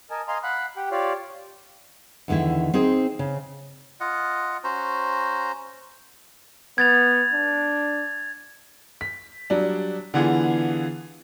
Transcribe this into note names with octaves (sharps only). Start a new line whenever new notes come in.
A#4 D#5 G#5 A5
D#5 F5 G#5 A#5 C6
F5 F#5 B5 F#6
G4 F#5 G5
F4 G4 C#5 D5 F5
E2 D3 D#3 A3 E4
C4 D#4 G#4 C5
C#3
F4 D#5 F#5
C#4 F#4 C5 A#5
B3 G#6 A6 F7
D4
B6
F#3 G3 D4
D3 E3 B3 F4 G#4